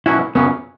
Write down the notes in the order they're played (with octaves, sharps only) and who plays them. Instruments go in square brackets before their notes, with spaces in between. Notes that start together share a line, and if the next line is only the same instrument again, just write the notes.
[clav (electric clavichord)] B2 F#3 C#4 F#4 [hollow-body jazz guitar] E4
[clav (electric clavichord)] F#2 C#3 F#3 C#4 [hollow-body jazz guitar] B3